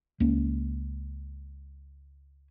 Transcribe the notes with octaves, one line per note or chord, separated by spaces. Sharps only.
C#2 A#3 C#4